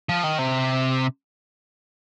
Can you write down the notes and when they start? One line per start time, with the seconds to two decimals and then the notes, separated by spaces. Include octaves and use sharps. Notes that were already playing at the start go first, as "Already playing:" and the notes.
0.09 F3
0.24 D#3
0.39 C3